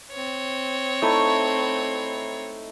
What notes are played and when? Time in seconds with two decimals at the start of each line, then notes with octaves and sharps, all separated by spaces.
0.12 C4 C#5
1.02 A3 D#4 E4